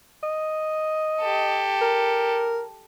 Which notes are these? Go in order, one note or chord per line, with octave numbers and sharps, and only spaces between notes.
D#5
G4 A4
A#4